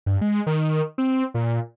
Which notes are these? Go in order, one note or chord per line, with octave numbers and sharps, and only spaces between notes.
G2
G#3
D#3
C4
A#2